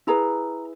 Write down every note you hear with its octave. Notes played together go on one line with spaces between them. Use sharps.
E4 G#4 B4 A#5